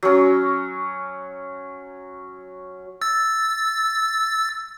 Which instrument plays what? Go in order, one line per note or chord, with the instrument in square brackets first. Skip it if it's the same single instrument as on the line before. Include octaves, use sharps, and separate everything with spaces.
[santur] F#3 C#4
[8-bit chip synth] E6 A6